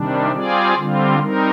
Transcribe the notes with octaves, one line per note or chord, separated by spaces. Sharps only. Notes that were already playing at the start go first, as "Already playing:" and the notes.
Already playing: C3 D#3 G3 D4
G3 C4 F4 G#4 D5
D3 G3 C4 F4
G3 C4 D#4 A#4